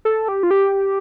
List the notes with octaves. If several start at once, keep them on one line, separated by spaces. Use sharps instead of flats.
A4
G4
F4
G4